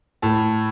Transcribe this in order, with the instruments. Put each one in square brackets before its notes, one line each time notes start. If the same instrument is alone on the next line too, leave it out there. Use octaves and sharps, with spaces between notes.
[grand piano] A2 A5